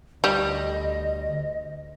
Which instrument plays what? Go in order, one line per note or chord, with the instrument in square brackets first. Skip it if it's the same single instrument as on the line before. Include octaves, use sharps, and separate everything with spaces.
[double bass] D2 [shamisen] G3 [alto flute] D#5